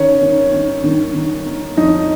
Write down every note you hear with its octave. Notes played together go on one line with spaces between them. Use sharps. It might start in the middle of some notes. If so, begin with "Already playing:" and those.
Already playing: D#3 C#4 C#5
D#3
D#3
D#3
D#3
D#3
F2 D#4 D#5